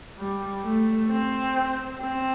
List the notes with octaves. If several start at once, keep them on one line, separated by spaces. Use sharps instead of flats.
G3
A3
C4
C4